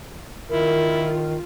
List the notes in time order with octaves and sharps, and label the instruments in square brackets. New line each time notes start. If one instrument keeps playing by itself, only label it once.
[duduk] D#3 [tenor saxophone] E4 [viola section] F4 [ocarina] A#4